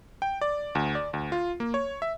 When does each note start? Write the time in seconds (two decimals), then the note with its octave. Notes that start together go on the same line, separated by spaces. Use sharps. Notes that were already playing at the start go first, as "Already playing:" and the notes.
0.22 G5
0.41 D5
0.75 D2
0.95 D5
1.13 D2
1.32 F4
1.60 A#3
1.74 C#5
2.02 E5